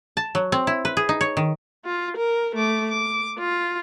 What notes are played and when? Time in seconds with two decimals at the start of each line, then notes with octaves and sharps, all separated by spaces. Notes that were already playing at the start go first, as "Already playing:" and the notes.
0.17 A5
0.35 F#3
0.52 C4
0.67 E4
0.85 B4
0.97 G#4
1.09 D#4
1.21 C#5
1.37 D#3
1.85 F4
2.17 A#4
2.55 A3 D6
2.91 D6
3.38 F4